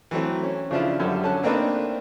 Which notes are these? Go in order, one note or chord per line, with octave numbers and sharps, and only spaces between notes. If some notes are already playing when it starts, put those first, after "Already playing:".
E3 F#3 A3 C4
C#4
C#3 F3 D4 E4 F4
F#2 D3 G3
D3 C#4 A5 F#6
A3 A#3 C4 D4 D#4 B4